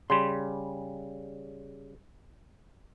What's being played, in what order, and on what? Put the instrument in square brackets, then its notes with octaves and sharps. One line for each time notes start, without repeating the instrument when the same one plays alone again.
[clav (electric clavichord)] C#3 G3 [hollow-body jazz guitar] C6